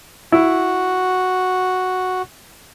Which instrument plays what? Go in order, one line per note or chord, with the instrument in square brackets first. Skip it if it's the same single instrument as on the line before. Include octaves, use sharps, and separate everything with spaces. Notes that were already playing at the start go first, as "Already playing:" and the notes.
[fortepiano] E4 [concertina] F#4